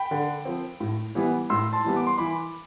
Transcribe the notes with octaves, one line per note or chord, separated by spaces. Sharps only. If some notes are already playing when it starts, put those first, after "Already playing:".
Already playing: G5 B5
D3
F3 C4
A2
E3 G3 B3
A2 C6 E6
A5 C6
E3 G3 B3
D6
C6
E3 B5 D6